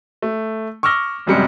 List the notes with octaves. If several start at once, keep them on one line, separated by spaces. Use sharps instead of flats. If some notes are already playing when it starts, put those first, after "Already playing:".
A3
C#6 D6 E6 F6 A#6 G7
G#1 F#2 C3 G3 G#3 C#7